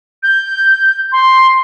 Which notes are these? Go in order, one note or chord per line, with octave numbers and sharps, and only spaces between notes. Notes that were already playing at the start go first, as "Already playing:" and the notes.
G6
C6